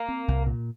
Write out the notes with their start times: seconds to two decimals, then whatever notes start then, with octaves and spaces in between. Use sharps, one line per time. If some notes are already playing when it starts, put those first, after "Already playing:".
Already playing: A#3
0.08 C4
0.28 C2
0.47 A#2